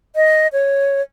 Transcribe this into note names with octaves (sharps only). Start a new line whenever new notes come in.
D#5
C#5